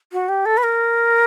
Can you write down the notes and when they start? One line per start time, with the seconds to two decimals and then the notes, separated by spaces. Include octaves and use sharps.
0.12 F#4
0.29 G4
0.45 A4
0.57 B4
0.63 A#4